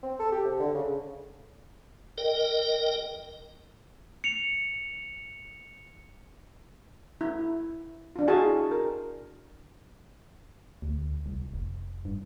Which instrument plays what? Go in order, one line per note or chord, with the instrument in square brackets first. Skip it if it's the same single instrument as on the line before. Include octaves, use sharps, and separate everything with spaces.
[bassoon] C4
A4
G4
C3
D3
C#3
[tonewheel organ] A#4 D#5 G5
[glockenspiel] C#7 F7
[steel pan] E4
D4 F4
E4 F#4 G#4 F5 G#5 A5
A#4
[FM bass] D2
C2
F1
G2